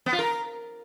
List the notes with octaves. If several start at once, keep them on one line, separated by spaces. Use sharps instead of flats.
B3
F4
A#4